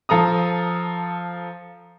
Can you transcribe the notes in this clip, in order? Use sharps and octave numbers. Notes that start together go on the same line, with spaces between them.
F3 A4 A#5 D#6